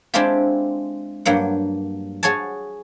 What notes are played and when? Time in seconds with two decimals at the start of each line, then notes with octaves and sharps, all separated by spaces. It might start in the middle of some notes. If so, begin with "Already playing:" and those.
0.14 G#3 C4 D4 E4 F4 G4
1.25 G2 F#3 A#3 F#5
2.23 F#4 G#4 C#5 G#5 A5